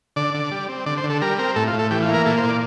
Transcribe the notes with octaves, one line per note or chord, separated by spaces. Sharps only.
D3 D5
D3
G3
C4
D3 D5
C5
D3
A4
G3 A#4
C4 A#4
A2 A4
F4
A2
A4
E3 G4
F4
A#3
A#4
A#2 A4
C5
A#2
D5